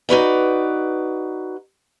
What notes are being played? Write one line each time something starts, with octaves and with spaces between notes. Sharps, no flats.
D#4 F#4 B4 D5